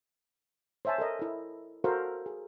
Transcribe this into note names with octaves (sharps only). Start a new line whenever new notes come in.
C5 C#5 E5 G#5 A5
A4 A#4 D#5
E4 A4
F#4 A4 A#4 C5 F5
G#4